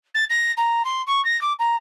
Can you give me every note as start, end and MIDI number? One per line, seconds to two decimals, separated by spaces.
0.14 0.24 93
0.29 0.52 94
0.57 0.82 82
0.84 1.02 84
1.06 1.23 85
1.24 1.39 94
1.41 1.53 86
1.59 1.76 82